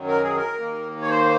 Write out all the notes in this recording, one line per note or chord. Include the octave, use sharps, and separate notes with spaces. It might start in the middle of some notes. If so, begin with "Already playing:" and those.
Already playing: F#2 D#3 F#3
A#4
G#4
A#4
D#2 D#3 A#3
C#5
C5